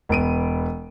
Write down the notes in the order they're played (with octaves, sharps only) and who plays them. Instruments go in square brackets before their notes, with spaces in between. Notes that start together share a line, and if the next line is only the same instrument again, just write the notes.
[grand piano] E1 B3 D7 D#7